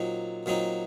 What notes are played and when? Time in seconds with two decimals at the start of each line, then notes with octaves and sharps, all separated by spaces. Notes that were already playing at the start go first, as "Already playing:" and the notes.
Already playing: A#2 F#3 C4 D#4
0.46 A#2 F#3 C4 D#4